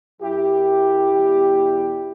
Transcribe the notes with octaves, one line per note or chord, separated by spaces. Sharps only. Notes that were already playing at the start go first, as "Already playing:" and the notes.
F#2 F#3 E4 G4
E2 B2 G3